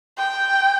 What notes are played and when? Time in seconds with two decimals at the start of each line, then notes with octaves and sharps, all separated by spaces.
0.18 G5